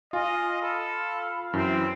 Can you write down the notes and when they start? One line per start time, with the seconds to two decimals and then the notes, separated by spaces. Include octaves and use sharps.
0.13 F4 D#5 F5 G#5
0.62 A4 B5
1.53 F#2 E3 C4